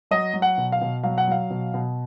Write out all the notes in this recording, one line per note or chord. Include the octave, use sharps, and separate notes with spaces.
F#3 D#5
F#3
F#5
B2
F5
B2
F#3 F5
F#5
F#3 F5
B2
B2